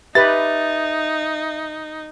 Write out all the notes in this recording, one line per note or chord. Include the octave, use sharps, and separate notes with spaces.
D#4 G4 B4 E5 A6